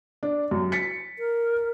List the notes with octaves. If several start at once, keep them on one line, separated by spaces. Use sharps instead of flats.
D4
F#2
A6 B6 C#7
A#4